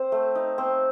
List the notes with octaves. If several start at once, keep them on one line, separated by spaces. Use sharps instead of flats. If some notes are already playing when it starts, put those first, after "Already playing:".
Already playing: C4 C5
A3
D#4
C4